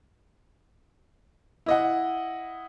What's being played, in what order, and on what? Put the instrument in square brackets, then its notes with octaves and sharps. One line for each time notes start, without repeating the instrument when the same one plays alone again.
[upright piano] E4 D#5 F#5